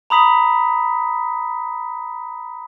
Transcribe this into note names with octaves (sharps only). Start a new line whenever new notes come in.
A#5 B5 D#6 B6